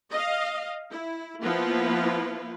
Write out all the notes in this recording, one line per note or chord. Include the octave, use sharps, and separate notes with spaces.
D#5 F5
E4
F3 A#3 B3 E4 F4 B4